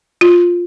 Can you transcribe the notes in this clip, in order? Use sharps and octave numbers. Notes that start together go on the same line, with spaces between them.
F4